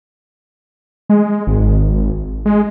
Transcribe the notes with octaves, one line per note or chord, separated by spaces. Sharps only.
G#3
G#1
G#3